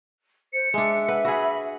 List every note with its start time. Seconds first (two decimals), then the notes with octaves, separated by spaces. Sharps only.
0.53 C5 C#7
0.74 G#3 D4 E5
1.08 B4 F#5
1.25 F#4 G#4 B5